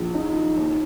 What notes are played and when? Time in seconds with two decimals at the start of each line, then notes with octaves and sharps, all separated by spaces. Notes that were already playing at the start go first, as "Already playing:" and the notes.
Already playing: A#1
0.14 D#4
0.35 D#3
0.57 D#2